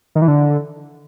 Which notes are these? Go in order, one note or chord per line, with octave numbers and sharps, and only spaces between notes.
D#3
E3
D3